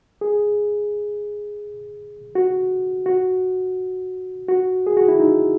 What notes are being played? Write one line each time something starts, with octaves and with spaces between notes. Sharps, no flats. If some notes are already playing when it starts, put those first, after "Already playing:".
G#4
F#4
F#4
F#4
G#4
F#4
E4
D#4